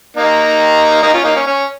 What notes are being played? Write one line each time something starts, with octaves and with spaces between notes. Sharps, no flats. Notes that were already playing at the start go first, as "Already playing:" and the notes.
A#3 D#4
A#3 D#4
C#4 F4
A#3 D#4
C#4
C#4